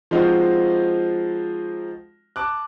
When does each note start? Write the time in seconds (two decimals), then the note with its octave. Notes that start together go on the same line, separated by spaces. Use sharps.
0.11 F3 G#3 C4 D#4 F4 F#4
2.36 A5 D6 F#6